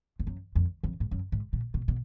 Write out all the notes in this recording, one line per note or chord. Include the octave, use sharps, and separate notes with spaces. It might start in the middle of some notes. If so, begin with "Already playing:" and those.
F2
F#2
F2
F2
G#2
F#2
G#2
A#2
B2
B2